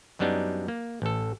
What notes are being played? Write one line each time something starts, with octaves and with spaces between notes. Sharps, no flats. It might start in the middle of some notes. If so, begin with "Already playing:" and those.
F#2 F#3 G3 B3 D4 D#4
A#3
A1 A4